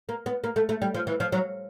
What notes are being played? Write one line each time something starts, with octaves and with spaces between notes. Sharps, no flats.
A#3
B3
A#3
A3
A3
G3
F3
E3
F3
F#3